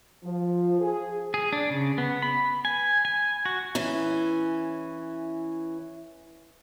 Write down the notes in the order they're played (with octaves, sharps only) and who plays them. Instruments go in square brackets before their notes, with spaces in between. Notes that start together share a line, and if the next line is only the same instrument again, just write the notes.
[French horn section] F3
G#4
[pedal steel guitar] G#4
D4
C#3
B3
B5
G#5
G#5
F#4
[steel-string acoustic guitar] E3 C#4